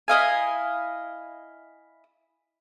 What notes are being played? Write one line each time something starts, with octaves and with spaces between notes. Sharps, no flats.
E4 D#5 F5 G#5